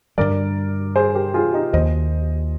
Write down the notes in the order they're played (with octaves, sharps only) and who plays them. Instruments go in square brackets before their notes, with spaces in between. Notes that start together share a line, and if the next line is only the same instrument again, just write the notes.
[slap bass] G2 D3 G3 [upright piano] A#4 D5
[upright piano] G#4 C5
G4 A#4
F4 G#4
D#4 G4
[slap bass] D#2 D#3 A#3 [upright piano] C5 D#5